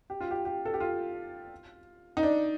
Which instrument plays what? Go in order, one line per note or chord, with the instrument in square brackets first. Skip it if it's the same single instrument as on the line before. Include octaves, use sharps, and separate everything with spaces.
[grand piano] G4
F4
G4
G4
A4
G4
F4
D#4
D4